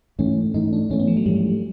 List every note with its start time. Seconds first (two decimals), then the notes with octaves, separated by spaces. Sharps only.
0.19 G#2 E3 A3 C#4
0.54 G#2 E3 A3 D#4
0.73 D4
0.90 G#2 E3 A3 C#4
1.00 B3
1.08 F3
1.17 F#3
1.26 G#2 E3 G3 A3